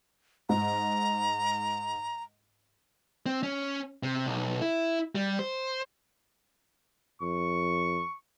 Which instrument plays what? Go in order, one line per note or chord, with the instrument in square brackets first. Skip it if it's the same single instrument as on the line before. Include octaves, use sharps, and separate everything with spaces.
[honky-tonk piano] G#2 [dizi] A#5
[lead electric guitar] C4
C#4
C3
B1
E4
G3
C5
[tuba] F2 [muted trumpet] C#6